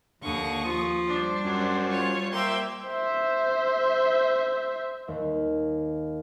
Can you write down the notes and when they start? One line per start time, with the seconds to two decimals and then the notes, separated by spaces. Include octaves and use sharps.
0.22 D#2 D3 C#6 D#6
0.64 F3
1.08 G3 D4 C5
1.45 F#2
1.88 F4 C#5
2.33 A#3 E5 G5 C6
2.88 C5 E5
5.08 D#2